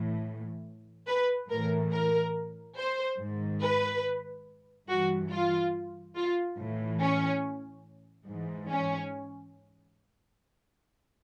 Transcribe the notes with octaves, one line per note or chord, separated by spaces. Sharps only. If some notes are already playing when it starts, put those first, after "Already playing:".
Already playing: A2 E3
B4
A2 E3 A#4
A#4
C5
G#2 D#3
B4
G2 E3 F#4
F4
F4
A2 E3
C#4
G#2 E3
C#4